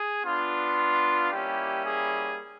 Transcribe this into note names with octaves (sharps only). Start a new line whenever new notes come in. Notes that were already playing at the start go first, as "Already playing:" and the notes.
Already playing: G#4
B3 D4 F4
G3 A#3 C#4 E4 G4
G#4